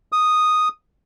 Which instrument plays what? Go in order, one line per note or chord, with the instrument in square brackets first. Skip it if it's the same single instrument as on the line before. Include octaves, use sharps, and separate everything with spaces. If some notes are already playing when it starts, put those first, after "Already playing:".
[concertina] D#6